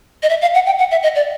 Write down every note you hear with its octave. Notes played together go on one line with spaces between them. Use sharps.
D#5
E5
F5
F#5
G5
F#5
E5
D#5
D5